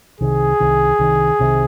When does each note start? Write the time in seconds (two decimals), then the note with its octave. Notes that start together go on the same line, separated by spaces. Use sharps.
0.21 C2 C3 D#3 G#4
0.60 C2 C3 D#3
0.99 C2 C3 D#3
1.39 C2 C3 D#3